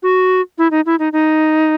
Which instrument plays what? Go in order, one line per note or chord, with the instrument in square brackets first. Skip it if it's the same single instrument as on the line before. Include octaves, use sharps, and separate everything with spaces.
[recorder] F#4
E4
D#4
E4
D#4
D#4